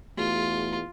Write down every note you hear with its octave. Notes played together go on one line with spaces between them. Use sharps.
E2 A3 F4 F#4 G#4